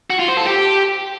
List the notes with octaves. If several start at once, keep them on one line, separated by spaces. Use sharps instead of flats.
F#4
F4
C5
A4
G4